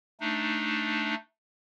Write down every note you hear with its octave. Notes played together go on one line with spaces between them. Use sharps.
A3 D4 D#4